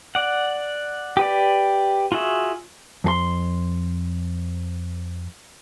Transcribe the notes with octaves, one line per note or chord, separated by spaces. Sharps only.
D5 F#5
G4 B4 D5
F4 F#4 G#4 E5
F2 G#4 C6